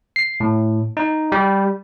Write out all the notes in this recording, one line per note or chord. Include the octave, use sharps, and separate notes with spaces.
C7
A2
D#4
G3